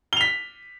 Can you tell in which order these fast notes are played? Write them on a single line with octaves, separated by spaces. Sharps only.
G7 F7 B6